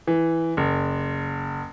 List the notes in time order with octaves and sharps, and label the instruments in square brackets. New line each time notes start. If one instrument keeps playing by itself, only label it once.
[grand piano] E3
F#1